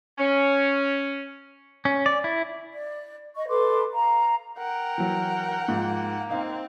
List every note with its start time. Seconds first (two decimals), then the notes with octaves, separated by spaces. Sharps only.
0.18 C#4
1.85 C#4
2.06 D5
2.24 E4
2.73 D5
3.36 D#5 C#6
3.48 A4 B4 C6 D6
3.93 F5 A#5
4.58 A#4 F#5 G5
4.98 E3 F#3
5.68 G#2 F3 A#3
6.30 C4 D#4 F5